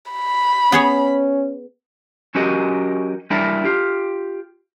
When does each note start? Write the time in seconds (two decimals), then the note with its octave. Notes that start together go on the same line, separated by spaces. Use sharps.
0.12 B5
0.72 B3 C#4 G#4 C#5
2.35 F#3 C#4 F#4 G4 A#4 D#5
3.30 G3 D4 E4 A#4 D5
3.64 F4 G4